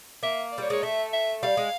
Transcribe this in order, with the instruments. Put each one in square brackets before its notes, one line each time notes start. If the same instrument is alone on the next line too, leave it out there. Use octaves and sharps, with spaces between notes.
[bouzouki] A#3 [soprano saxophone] E5
[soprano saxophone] D5
[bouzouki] G3 [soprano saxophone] C#5
[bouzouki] G#3 [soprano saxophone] C#5
[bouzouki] A3 [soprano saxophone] E5
[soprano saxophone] E5
[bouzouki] G3 [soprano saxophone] F5
[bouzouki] G#3